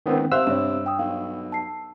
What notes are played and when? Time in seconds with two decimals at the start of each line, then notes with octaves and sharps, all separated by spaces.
0.06 C#2 D#3 B3 C4
0.32 C3 C5 E5 F5 E6 F#6
0.47 G2 C#5 E7
0.86 G5 D#6
0.99 B1 F5
1.52 A5 C7